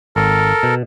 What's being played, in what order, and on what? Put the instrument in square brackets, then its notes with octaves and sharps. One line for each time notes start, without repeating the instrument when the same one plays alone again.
[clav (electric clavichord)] G#1 [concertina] A4 A#4
[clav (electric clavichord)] B2